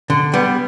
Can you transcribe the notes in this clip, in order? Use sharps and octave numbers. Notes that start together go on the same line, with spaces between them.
D3
G3 B3